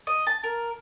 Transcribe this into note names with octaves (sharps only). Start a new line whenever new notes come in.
D#5
A5
A#4